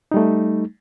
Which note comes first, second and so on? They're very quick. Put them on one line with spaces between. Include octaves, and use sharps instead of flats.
D#4 G3 A3